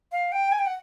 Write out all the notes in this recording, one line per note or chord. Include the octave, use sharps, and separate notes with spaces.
F5
G5
G#5
G5
F#5